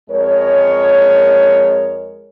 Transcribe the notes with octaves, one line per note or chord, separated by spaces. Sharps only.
F2 G#3 A#4 C#5